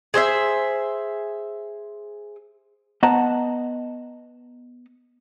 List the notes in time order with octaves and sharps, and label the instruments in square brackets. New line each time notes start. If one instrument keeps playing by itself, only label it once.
[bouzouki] G#4 C5 D#5 E5
[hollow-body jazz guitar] B3 D#5 F#5 A5 A#5